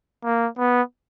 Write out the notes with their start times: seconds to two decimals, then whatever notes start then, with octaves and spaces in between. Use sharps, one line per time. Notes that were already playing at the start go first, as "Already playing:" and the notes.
0.24 A#3
0.58 B3